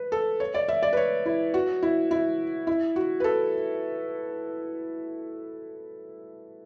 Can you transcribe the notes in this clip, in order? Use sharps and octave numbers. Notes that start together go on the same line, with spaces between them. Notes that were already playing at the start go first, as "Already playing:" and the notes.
Already playing: B4
A4
C#5
D5
E5
D5
B4
C#5
E4
F#4
E4
E4
E4
F#4
B4
A4